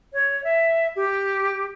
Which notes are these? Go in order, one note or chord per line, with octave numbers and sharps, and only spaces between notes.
C#5
E5
G4